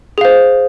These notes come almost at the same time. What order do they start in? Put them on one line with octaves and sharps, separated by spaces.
G#4 F5 C5